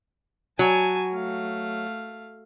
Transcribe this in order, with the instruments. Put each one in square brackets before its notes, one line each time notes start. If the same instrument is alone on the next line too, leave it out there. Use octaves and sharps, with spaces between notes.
[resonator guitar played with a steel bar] F#3 [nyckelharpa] G#5 A5
[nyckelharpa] A3 F5